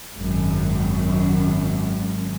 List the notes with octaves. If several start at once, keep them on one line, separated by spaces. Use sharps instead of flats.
G#1 F#2